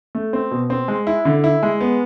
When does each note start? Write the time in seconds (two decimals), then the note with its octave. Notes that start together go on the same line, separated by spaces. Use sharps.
0.15 A3
0.33 C4
0.51 B2
0.70 C4
0.88 G#3
1.07 E4
1.25 D3
1.44 E4
1.63 G#3
1.81 B3